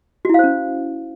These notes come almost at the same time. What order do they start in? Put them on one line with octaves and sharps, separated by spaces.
F#4 E4 F5 C5 C#4